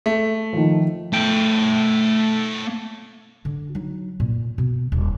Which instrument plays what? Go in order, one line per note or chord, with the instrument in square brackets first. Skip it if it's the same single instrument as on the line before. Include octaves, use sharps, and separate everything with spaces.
[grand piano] A3
[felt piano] D#3 F3
[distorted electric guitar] A3 G5
[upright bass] D3
F#3 D#4
A#2
B2
D#1